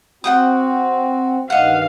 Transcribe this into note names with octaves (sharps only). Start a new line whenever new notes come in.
C4 F#4 F#5 G5 D#6
G2 D#3 D#5 F5 F#5